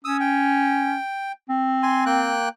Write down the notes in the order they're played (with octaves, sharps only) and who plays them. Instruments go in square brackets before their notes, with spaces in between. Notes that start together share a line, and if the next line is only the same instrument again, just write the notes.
[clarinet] C#4 [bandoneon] D#6 E6
[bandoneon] G5
[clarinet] C4
[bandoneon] G#5 C6
A#3 G5 F#6